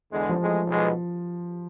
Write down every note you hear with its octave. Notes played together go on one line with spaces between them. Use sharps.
E2 D3 G#3
F3
A1 A2 G#3
B1 B2 G#3 B3